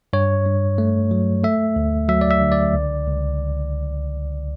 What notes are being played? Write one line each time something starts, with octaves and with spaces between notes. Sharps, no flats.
G2 C#5
G2
A3
F#3
A3 E5
D2
F#3 E5
D5
E5
D3
D5
C#2
C#2